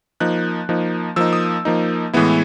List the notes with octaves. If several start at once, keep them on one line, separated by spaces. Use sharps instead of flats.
F3 A#3 D#4 F#6
F3 A#3 D#4
F3 A#3 D#4 E6
D#6
F3 A#3 D#4
A2 E3 G#3 B3 E4